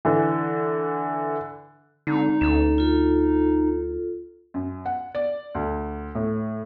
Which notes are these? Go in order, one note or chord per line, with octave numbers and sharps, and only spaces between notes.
D3 E3
D3 G#3 C4 D#4
D2 C#4 A4
F4 A4
F#2
F#5
D5
D2
A2